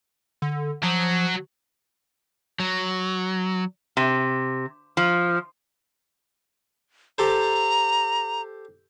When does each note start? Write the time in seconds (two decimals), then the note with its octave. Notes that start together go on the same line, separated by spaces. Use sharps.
0.42 D3
0.83 F3 F#3
2.60 F#3
3.97 C3
4.97 F3
7.18 G4 A4 C5 A#5